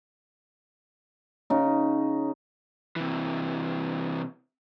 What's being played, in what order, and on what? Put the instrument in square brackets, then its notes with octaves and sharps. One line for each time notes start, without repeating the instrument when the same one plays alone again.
[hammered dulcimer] C#3 D#4
[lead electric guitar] C3 E3